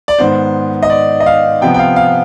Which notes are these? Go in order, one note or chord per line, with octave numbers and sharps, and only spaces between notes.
D5
G#2 D#3 B3 C5
D#5
D5
D#5
F5
C3 F3 B3 G5
G5
F5
F5